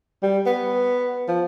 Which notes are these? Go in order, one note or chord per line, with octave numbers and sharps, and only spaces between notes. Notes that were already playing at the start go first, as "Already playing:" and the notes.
G3
B3
F3